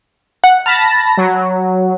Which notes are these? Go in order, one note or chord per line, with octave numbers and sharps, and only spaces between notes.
F#5
A5 B5 F6 A#6
F#3